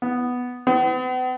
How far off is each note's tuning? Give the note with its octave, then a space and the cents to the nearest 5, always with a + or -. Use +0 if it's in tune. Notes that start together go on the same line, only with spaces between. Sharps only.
B3 +0
B3 +45